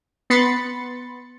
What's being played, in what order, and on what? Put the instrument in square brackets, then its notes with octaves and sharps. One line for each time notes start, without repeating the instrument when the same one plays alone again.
[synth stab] B3 B5 C6 A6 C#7